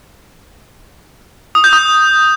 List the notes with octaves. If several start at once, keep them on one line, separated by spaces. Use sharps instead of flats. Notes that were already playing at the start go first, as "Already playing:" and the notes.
D#6
G6
D#6